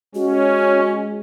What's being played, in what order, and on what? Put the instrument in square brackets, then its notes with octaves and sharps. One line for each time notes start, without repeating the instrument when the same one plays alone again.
[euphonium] G#3 [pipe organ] C#4 [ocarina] F#4